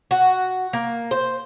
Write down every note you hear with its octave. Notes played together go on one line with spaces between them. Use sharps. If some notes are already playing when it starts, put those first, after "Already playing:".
F#4
A#3
C5